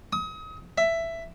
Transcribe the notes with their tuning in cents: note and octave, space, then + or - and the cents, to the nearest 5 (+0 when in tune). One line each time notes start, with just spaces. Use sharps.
D#6 +35
E5 +10